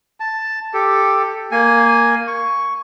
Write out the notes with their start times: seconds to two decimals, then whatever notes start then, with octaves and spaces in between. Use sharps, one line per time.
0.20 A5
0.74 G4 A4
1.52 A#3 G#5
2.27 C#6